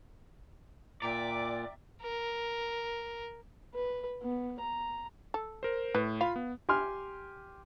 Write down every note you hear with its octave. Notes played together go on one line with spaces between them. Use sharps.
A#2 D5 E5 G5 A#5 D6
A#4
B4
B3
A#5
A4
A#4 C5
A2 B4
F4 F5 B5
B3
G4 G#5 C6 F6